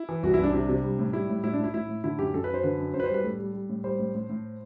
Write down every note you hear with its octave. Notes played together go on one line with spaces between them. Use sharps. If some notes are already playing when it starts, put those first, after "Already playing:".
Already playing: E4
E3
C2 F#4
E4
C2 D4
C3
C3
G3
A2
G3 E4
A2
A2 E4
A2 D4
E4
A2 E4
A2
D3 E4
F#2 G4
F#2 A4
B4
F#2 C5
D3 B4
F#2
F#2 C5
B4
C5
G3
B4
A2 A4
G3
G3
A2
G3 C5
A2
A2
A2